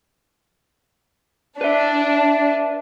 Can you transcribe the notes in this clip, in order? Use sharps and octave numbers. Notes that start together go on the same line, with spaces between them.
D4 B4 E5